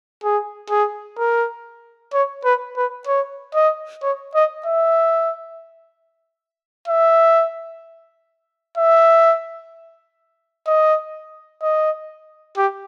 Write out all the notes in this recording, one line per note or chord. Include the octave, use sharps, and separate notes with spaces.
G#4
G#4
A#4
C#5
B4
B4
C#5
D#5
C#5
D#5
E5
E5
E5
D#5
D#5
G4